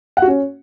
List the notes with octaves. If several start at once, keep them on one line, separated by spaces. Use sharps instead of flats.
F#5
F#4
C#4